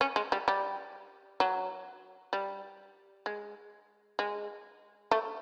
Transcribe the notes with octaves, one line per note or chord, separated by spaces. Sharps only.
C#4
G#3
G3
G3
F#3
G3
G#3
G#3
A3